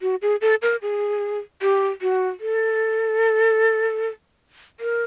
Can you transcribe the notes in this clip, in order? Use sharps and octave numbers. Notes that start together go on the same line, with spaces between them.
F#4
G#4
A4
A#4
G#4
G4
F#4
A4
A#4